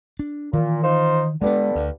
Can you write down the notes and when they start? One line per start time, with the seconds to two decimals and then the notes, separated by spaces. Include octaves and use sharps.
0.19 D4
0.53 A#2 D#3 E3
0.83 D#4 F4 C5
1.42 G2 D3 G#3 A#3 B3
1.75 D2